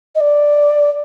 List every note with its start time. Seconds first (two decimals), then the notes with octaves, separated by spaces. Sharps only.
0.15 D#5
0.20 D5